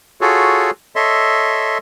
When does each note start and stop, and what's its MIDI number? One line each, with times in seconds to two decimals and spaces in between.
0.21 0.71 65
0.21 0.71 66
0.21 0.71 68
0.21 0.71 69
0.21 0.71 73
0.96 1.78 69
0.96 1.78 73
0.96 1.78 75
0.96 1.78 76
0.96 1.78 84